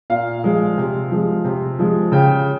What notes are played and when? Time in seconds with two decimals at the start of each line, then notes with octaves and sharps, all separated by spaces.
0.10 A#2 F5
0.44 F3 G#3
0.77 C3
1.11 F3 G#3
1.44 C3
1.79 F3 G#3
2.12 C#3 G5